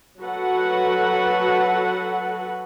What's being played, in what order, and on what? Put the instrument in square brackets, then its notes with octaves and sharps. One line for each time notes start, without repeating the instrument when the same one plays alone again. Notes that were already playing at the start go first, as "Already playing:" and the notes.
[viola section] F#3 F#4 A4 B4 F#5